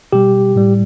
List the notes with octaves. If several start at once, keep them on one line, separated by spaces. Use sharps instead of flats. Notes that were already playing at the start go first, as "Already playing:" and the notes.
B2 G3 G4
A2 G3